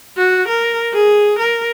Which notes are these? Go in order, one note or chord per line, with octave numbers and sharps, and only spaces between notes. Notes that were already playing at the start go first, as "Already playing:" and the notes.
F#4
A#4
G#4
A#4